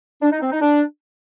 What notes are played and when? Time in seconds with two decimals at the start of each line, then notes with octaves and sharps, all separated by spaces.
0.22 D4
0.32 D#4
0.41 C4
0.51 D#4
0.61 D4